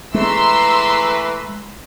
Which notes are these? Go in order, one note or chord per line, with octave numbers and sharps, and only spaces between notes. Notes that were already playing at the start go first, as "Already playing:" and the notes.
E3 G#3 A3 B4 A#5 C6 E6